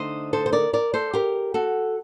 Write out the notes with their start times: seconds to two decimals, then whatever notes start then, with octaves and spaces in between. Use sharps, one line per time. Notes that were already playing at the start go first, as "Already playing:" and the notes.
Already playing: D3 A3 D#4 C5 D#5
0.33 A4 C5
0.46 C5
0.52 A#4 D5
0.73 A#4 D5
0.94 A4 C5
1.13 G4 A#4
1.54 F#4 A4